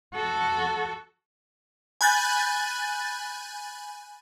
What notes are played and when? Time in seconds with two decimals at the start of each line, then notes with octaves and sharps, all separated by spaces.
0.15 F#4 A4
2.01 G#5 B5 F#6 G6 A6